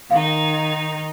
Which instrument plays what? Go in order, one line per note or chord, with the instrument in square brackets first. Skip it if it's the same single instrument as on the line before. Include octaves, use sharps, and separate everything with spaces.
[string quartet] D#3 D#4 [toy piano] F5